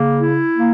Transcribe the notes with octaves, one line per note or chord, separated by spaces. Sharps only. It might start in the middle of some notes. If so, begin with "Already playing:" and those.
Already playing: C#3 A#3
E4
A#3